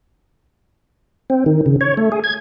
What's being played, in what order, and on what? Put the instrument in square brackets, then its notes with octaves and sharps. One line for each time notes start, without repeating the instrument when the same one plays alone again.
[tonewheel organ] C4
D#3
C#3
C#5
A3
G#4
G#6